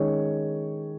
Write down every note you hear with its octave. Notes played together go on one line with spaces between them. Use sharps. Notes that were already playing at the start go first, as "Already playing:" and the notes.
Already playing: D#3 G#3 C#4 C#5